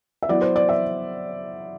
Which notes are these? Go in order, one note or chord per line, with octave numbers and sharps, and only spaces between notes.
E5
F#3 B3 E4 D5
C5
D5
E5